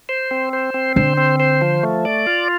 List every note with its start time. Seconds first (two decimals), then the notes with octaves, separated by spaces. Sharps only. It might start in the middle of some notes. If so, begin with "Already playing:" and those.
0.09 C5
0.31 C4
0.53 C5
0.74 C4
0.96 D3 C5
1.17 C4
1.40 C5
1.61 F3
1.83 A3
2.05 D5
2.27 F4